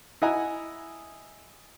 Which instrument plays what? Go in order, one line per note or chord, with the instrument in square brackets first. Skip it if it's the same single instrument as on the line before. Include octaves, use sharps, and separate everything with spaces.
[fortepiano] E4 D#5 F#5 G#5 A#5